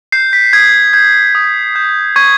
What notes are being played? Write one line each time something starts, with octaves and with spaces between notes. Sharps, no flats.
G6 C7
B6
D#6 G#6
G6 G#6
D#6
G6
C#6 G#6